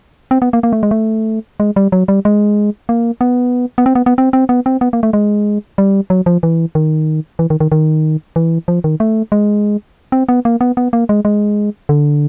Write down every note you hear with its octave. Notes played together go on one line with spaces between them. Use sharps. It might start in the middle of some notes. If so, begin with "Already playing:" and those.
C4
B3
A#3
A#3
A3
G#3
A3
G#3
G3
F#3
G3
G#3
A#3
B3
B3
C4
B3
B3
C4
C4
B3
C4
B3
A#3
A3
G#3
G3
F#3
F3
E3
D#3
E3
D#3
D#3
D#3
E3
F3
D#3
A3
G#3
C4
B3
A#3
B3
B3
A#3
G#3
G#3
D3